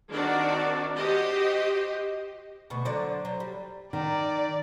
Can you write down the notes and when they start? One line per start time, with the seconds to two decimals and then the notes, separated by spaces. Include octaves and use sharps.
0.11 D#3 C4 D4 F#4 A#4 D5
0.97 F#4 G4 C5 D#5
2.70 D2 B2 B3 C#6
2.85 D3 F#3 C5 D5
3.25 F#3
3.40 G3
3.93 D#3 D5